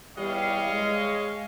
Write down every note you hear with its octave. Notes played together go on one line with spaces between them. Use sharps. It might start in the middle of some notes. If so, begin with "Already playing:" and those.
E2 E3 G3 C#5 D#5 F5
G#3